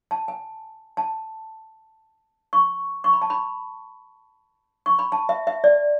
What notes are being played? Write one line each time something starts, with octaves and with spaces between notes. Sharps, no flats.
A5
G#5
A5
C#6
C#6
B5
A5
B5
C#6
B5
A5
E5
E5
D5